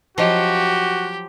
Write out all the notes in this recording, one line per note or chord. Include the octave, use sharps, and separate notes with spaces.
F3 F#3 C#4 F#4 G4 D#5 F5